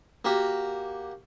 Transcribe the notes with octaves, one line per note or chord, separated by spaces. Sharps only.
A#3 F#4 G4